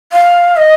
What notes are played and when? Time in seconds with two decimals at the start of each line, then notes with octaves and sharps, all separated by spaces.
0.13 F5
0.57 D#5